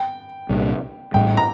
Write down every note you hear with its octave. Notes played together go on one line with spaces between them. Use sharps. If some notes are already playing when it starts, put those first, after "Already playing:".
Already playing: G5
C2 A#2 G3 D4
A1 A2 G3 G5
A#5